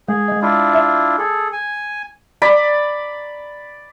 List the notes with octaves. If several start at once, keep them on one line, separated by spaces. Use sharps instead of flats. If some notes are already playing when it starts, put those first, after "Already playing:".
G#3 G#4
G#3 D#5
D4 E4 F4
E5
G#4 A4
G#5
D5 B5